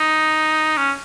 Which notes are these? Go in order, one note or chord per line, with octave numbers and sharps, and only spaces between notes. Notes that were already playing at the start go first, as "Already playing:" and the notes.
Already playing: D#4
C#4